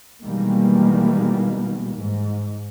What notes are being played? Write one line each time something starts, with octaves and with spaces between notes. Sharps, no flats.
B2 D#3 E3 G3 G#3 A#3
G#2